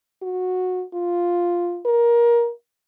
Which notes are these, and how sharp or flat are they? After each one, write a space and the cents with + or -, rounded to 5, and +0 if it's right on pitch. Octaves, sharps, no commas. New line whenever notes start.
F#4 -15
F4 +0
A#4 +20